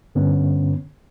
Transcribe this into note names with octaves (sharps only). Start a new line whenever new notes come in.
G2 D3 B3 C#4